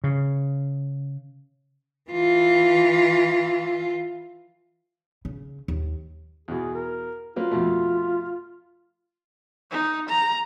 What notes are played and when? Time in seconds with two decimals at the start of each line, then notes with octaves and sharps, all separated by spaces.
0.04 C#3
2.11 E3 F4
5.25 C#3
5.68 D#2
6.48 E2 B2 G#4
6.74 A#4
7.36 F#3 A#3 F4 B4
7.52 F2 B2 A3
9.71 D#4
10.08 A#5